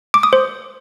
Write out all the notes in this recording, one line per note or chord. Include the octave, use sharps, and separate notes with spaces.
D6
D#6
C5